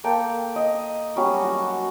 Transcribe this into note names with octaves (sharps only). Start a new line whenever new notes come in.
A#3 A4 G5
D#5
F#3 G3 C#4 F#4
F#4